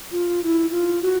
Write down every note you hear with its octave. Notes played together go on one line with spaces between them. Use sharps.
F4
E4
F4
F#4